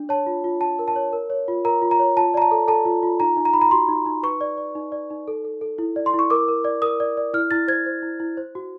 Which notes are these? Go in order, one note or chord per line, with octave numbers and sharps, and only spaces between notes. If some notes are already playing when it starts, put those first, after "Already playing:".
Already playing: D4
C#5 A5
F4
F4
F4 A5
A#4
A5
C#5
A#4
C#5
F4
A#4 A#5
F4
A#5
C#5
F4 A5
D5 A#5
A5
A4
A4 A5
F4
F4
D#4 A#5
D#4
A#5
D#4 B5
A#5
F#4 C6
D#4
D#4
B4 C#6
D5
D5
D#4
D5
D#4
A4
A4
A4
E4
D5
C6
E4
C#6
A#4 D6
A#4
D5
A#4 D#6
D5
D5
E4 F6
E4 A6
C5 G#6
C5
E4
E4
C5
F#4